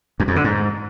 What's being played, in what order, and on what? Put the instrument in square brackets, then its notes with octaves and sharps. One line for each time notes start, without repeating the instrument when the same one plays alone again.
[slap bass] F#2
F2
D3
G#2